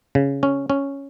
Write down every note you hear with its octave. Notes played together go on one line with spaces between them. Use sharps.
C#3
C#4
C#4